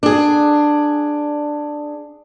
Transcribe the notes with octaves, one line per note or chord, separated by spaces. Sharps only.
D4 G#4